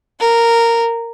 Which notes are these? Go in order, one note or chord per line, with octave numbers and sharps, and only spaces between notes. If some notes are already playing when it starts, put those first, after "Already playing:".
A#4